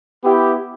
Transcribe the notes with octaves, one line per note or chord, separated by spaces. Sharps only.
B3 E4 G4